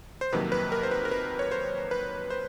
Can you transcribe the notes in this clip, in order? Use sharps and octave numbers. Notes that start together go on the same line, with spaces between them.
C5
F2 C3 D#3 F#3 A#3 B4
B4
A#4
C5
B4
A#4
B4
C#5
C5
B4
C5